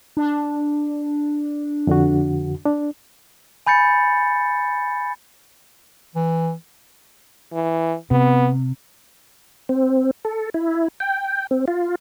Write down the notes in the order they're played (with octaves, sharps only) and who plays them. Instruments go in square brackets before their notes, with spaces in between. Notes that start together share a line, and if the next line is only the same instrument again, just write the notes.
[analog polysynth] D4
[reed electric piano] F2 D3 F#4
D4
[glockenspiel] G#5 B5 G6 A6 C#7
[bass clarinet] E3
[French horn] E3
[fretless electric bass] C3 [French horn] B3
[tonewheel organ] C4
A4
E4
G5
C4
F4